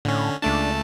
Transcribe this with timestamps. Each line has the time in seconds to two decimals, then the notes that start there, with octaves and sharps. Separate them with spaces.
0.05 A2 D3 C#4
0.42 C#2 A3 D4 A5